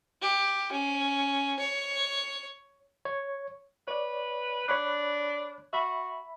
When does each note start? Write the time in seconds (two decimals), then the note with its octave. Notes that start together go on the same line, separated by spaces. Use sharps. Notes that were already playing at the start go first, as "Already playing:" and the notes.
0.22 G4
0.72 C#4
1.59 C#5
3.05 C#5
3.88 B4 C#5 D5
4.68 D4 C#5 B5 F#6
5.73 F#4 E5 B5